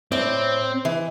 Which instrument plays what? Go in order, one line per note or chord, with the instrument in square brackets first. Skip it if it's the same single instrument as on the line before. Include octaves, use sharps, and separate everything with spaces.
[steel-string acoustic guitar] A2 D5 [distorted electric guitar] C4
[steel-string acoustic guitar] E3